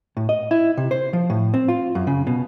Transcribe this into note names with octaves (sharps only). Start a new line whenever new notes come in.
A2
D#5
E4
C3
C5
F3
A2
C4
F4
F#2
C#3
B2